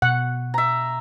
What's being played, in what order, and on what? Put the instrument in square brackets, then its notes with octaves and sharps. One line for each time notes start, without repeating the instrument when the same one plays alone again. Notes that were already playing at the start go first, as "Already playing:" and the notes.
[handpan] B2 [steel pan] F#5
[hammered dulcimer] E5 A#5